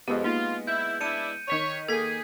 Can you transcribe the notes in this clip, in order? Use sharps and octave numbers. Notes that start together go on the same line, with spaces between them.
F2 G#3 B3 G4
A#3 D#4 F4
E4 G6
D4 E4 A5 C#7 D#7
D#3 C#5 B6 F7
D#3 A#3 G#4 A4 G#6 B6